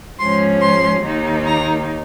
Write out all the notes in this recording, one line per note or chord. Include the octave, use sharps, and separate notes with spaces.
G#2 F3 G#3 C#4 C6
C6
D#2 D#3 A#3 D#4
A#5